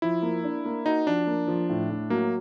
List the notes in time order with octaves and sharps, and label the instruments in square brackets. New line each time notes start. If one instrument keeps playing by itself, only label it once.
[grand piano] F3 [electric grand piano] E4
[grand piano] A#3
D4
A#3
[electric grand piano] D#4 [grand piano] F#4
[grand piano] F3 [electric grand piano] D4
[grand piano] A#3
F3
A2
A2
[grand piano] F#3 [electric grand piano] A#3